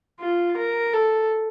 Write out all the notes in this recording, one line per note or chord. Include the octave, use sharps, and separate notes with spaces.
F4
A#4
A4